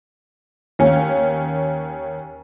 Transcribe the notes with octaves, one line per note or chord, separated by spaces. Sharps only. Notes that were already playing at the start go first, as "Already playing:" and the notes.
D#2 C#4